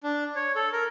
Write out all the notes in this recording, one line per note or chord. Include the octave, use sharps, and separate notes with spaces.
D4
C#5
A4
A#4